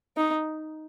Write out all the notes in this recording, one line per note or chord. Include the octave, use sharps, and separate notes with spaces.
D#4